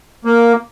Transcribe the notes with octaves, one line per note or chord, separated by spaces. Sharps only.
A#3